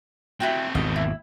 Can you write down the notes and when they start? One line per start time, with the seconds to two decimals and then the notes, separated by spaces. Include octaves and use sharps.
0.40 A3 C4 E4 F#4 G5
0.75 G#1 E2 B2 D#5
0.96 E4